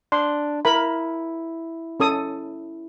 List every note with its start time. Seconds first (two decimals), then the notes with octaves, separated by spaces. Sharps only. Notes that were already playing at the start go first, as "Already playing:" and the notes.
0.12 D4 C6
0.65 E4 A#4 B5
2.00 C#4 A4 D#6